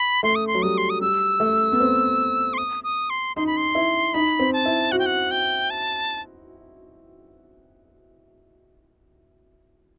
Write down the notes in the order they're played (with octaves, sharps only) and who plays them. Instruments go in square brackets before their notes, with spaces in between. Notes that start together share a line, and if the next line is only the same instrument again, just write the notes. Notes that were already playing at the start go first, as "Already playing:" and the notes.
Already playing: [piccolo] B5
[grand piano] A3 [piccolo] C6
[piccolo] D#6
C6
[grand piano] F#3
[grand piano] G3 [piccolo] D#6
[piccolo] C6
D#6
[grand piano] G3 [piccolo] E6
[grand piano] A3
B3
C4
[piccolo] C6
D#6
D#6
C6
[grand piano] D#4 [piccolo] C6
[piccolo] B5
C6
[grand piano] E4
[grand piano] D#4 [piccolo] B5
[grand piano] C4
[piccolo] A5
[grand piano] E4
[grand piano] F#4 [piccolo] F#5
[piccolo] G5
F#5
G5
A5